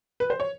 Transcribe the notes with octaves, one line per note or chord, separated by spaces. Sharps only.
B4
C5
C#5